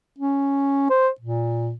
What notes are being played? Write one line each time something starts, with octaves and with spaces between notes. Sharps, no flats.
C#4
C5
A#2